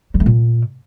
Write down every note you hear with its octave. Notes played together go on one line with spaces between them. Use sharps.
F#3
A3
A#2